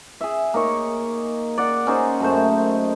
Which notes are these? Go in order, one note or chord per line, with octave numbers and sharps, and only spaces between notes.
G#4 E5
A#3 D#4 C#5 C#6
D5 F#5
C#4 D#4 G#4 C5
F#2 A3 C5